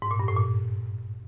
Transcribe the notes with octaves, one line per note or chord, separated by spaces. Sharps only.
G#2
A#2
G2
A2
A#2